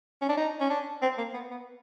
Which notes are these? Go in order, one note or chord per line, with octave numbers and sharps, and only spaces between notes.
C#4
D4
D#4
C#4
D4
C4
A#3
B3
B3